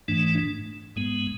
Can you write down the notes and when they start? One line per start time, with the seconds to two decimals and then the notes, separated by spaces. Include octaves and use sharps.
0.08 G#2 E3 A3 D4
0.96 G#2 G#3 B3